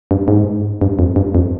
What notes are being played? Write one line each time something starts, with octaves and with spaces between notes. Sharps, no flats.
G2
G#2
G2
F2
G2
F2